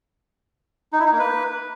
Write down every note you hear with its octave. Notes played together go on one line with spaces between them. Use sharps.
D#4
E4
D#4
A#3
B4